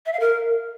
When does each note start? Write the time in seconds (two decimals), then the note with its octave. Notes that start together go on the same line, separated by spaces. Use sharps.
0.06 E5
0.13 F5
0.20 A#4